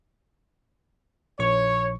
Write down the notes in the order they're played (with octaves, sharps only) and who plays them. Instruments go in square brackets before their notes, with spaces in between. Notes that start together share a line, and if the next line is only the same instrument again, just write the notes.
[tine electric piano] A#1 C#6 [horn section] C#5